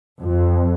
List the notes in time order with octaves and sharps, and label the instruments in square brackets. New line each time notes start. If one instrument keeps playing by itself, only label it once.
[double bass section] F2